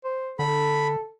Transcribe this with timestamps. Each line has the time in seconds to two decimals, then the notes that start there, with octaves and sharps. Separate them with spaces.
0.05 C5
0.39 D3 A4 B5